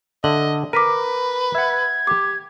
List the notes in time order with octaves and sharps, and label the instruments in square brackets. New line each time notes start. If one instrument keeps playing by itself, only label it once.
[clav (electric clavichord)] D3 E5 [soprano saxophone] D#5 [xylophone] F#7
[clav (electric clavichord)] A#4 [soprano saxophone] B4 [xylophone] D6 B6 D#7
[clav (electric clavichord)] E5 F#5 [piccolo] G#6
[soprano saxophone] G4 [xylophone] D6